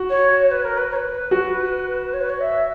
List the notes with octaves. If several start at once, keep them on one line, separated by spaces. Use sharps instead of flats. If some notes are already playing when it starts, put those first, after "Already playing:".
Already playing: F#4
C#5
B4
A#4
B4
C#5
B4
F#4
C#5
B4
C#5
E5